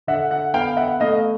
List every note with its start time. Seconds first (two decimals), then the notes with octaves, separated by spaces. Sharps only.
0.07 D3 E5 F#5
0.30 E5 F#5
0.54 B3 F5 G5
0.77 E5 F#5
1.00 A3 D#5 F5